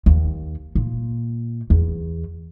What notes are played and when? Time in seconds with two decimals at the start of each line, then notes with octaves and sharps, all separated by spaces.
0.06 D#2
0.75 A#2
1.70 E2